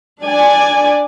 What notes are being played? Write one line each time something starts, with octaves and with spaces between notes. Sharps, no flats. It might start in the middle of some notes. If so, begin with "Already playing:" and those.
D4 D5 G#5